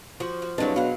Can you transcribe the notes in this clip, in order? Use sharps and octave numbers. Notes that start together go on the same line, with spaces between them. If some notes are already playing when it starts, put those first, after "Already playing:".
F3 F#4
F#4
C2 D3 F3 F#3 G#3 D4 B4 A5
B2 F5 F#5